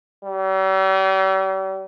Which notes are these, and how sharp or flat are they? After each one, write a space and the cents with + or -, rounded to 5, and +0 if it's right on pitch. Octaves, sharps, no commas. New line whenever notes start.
G3 -45